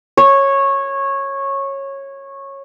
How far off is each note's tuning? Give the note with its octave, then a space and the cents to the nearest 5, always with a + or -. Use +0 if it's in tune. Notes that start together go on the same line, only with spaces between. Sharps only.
C#5 -15